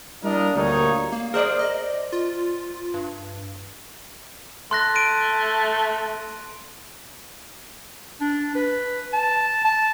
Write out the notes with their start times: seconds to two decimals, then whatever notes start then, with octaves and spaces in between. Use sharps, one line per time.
0.23 G3 A#3 D4 E4 A#4 D#5
0.55 D2 A#2 G3 A#3 D#4 C#5
1.12 A#3
1.34 G#4 A#4 C5 D5
1.59 D#5
2.12 F4
2.94 G2
4.71 A3 C6 F#6 A#6
4.95 D7 D#7
8.21 D4
8.56 B4
9.13 A5
9.65 A5